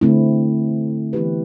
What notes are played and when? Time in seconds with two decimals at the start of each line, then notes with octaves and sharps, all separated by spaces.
0.01 D3 A3 C4 E4
1.13 E3 B3 E4 G4 B4